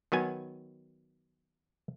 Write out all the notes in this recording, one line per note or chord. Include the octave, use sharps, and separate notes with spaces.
D#3 F#3 B3 G#5